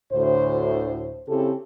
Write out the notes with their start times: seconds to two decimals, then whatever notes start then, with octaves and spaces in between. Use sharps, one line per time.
0.13 D2 A2 C5
1.28 C#3 C4 E4 G4 A4